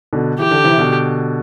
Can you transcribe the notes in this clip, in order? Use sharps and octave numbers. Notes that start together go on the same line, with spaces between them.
B2 D3
E3 G4
D3
C3 E3
B2 D3